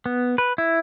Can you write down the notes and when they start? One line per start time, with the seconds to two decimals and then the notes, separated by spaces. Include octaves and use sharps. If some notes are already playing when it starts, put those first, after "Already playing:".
0.06 B3
0.38 B4
0.58 E4